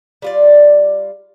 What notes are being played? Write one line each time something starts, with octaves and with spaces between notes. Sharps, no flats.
G3 F4 D5